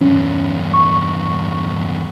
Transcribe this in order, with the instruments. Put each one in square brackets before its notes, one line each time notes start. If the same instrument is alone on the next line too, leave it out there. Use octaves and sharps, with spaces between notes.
[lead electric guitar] E2 G2 [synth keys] C#4
[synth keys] C#6